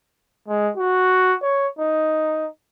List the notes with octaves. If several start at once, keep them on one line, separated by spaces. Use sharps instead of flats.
G#3
F#4
C#5
D#4